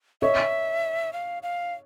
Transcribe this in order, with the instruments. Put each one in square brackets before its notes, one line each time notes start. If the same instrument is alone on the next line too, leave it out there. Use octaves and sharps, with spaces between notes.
[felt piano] C#5 D#5 [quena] E5
[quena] F5
F5